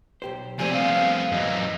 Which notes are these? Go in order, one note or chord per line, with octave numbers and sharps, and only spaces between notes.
B1 G4 C5
C3 F3 G3 A3 C4 G#5
B3 C4 F5
F#2 E3 D#5